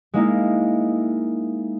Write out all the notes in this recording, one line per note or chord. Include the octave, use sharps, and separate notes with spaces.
G#3 A#3 D#4 E4